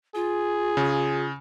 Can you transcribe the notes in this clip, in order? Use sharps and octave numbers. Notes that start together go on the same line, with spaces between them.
F4 G#4
C#3